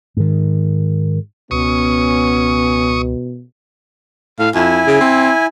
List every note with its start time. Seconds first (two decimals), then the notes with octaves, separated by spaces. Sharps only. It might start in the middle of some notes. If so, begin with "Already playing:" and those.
0.17 G#2 D#3
1.51 C#2 B2 B3 C#4 C#6 D#6
4.39 A2 F5
4.55 F2 E4 G#5
4.87 C#3
5.01 C4